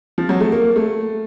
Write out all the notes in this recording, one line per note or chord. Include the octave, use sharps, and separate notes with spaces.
F3
F#3
A3
A#3
A3